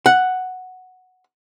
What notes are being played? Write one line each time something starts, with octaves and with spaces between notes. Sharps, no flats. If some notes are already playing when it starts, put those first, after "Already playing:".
F#5